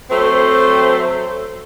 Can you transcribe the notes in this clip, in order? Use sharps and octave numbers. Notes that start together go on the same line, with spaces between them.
F#3 A3 C4 C5